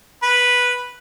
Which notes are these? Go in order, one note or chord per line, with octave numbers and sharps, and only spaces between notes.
B4